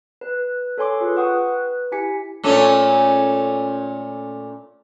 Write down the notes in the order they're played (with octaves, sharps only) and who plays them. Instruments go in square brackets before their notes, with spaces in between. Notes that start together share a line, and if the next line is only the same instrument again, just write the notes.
[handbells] B4
A4 C#5 G#5 C6 D6
F4 G#4 B4
B4 F#5 G5 C#6 D#6
B4
E4 G4 G#5 B6 C#7
[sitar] A#2 A3 C#4